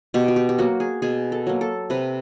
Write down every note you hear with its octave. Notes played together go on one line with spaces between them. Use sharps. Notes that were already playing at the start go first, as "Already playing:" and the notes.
B2 G4
F#4
G4
G4
F#3 A#3 F#4
G#4
B2 G#4
A4
F#3 A#3
A4
C3 B4